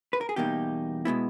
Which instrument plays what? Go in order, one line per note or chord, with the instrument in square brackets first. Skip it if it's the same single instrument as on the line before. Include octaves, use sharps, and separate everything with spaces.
[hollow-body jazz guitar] B4
A#4
G#4
E2 B2 G3 A#3 D#4 G4
B2 G#3 B3 E4